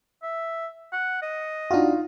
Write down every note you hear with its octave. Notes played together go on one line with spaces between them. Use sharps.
E5
F#5
D#5
D4 D#4 F4 F#4